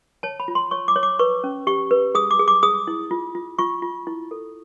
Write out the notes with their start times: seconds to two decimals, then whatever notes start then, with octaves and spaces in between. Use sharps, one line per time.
0.23 C#5 A5
0.40 B5
0.48 F4
0.55 C6
0.71 C#5 C#6
0.88 D6
0.96 C#5
1.03 D6
1.19 B4 C#6
1.44 C#4
1.67 G4 C#6
1.91 B4
2.15 G#4 D#6
2.31 D6
2.39 G#4
2.48 D6
2.63 G#4 D#6
2.88 E4
3.11 F4
3.35 F4
3.59 F4 C#6
3.82 F4
4.07 E4
4.31 A4